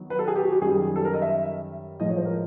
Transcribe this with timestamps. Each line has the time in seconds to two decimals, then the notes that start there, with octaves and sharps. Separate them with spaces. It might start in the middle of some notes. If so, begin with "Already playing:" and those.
Already playing: D#3 F#3 B3
0.10 B4
0.19 A4
0.27 G#4
0.36 G4
0.44 F#4
0.53 G4
0.61 F#2 D#3 G3 G#4
0.96 A4
1.05 A#4
1.13 D#5
1.22 E5
2.00 A2 F3 G#3 D#5
2.08 C#5
2.17 C5
2.25 A#4